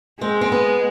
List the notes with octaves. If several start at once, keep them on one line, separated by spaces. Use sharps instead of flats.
G#3 C4
C4
B3